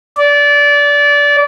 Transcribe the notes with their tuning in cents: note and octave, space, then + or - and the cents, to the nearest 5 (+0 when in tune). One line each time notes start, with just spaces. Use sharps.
D5 -20